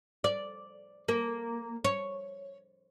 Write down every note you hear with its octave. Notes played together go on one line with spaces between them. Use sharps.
D5
A#3
C#5